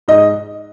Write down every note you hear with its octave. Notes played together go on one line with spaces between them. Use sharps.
G#2 D#5